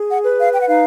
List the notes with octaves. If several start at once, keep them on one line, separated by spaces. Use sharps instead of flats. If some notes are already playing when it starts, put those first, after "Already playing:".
Already playing: G#4
F#5
B4
F5
G5
F#5
D#4 F5